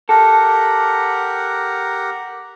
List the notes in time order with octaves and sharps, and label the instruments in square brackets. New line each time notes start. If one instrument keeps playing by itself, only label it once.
[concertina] G4 A#4 F#5 [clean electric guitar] A4